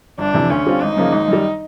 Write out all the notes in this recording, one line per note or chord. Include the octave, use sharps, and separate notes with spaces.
G1 D4
F2 C3 E3
D2 C#4
D3 G3 C4 F4
G#1 D#4
F#2 C#3 F3 A#3
G#1
F#2 D#3 G3